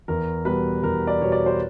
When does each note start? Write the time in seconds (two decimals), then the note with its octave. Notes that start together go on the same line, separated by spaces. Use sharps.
0.08 E2 A#4
0.45 B2 G3 B3 B4
0.83 E2 A#4
1.07 D5
1.20 B2 G3 B3 C#5
1.32 D5
1.46 C5